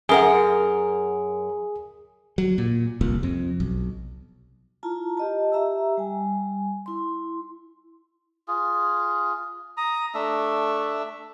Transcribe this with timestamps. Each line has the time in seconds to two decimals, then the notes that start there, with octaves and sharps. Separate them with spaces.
0.09 F#2 G#4 A#4 F#5
2.38 F#3
2.58 A#2
3.01 F1 C2 A#2
3.23 F2
3.60 B1
4.83 E4 F4 A5 A#5
5.17 G4 D#5 A5
5.52 G4 E5 A#5 E6
5.97 G3 G#5
6.86 E4 C6
8.48 F4 G#4
9.77 A#5 D#6
10.14 A3 D4 E5